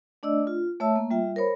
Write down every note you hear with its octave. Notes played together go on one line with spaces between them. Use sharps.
A3 D4 D5 D#5 E6
F4
A3 C#5 E5 A5 E6
A#3
G3 F4 E5 G5
A#4 C5 C#5 B5